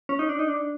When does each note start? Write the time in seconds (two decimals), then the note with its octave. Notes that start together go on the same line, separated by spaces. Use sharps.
0.09 C#4
0.19 D#4
0.29 D4
0.39 D#4
0.48 D4